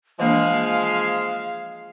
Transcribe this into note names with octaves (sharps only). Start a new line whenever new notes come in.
E3 F3 G#3 A#3 D4 F5